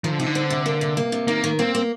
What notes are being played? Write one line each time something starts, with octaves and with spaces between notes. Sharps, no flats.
D#3 F3
D3
C3 D#4
D3
C4
C3
A#3
C3
A#3
C3
D#3 A#3
D#3
A#3 C4
A#3